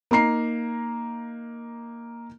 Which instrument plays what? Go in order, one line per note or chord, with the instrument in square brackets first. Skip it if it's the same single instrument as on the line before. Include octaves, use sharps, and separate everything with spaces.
[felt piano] A#3 D#4 A#5 C7